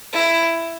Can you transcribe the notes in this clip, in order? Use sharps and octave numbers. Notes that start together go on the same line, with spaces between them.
E4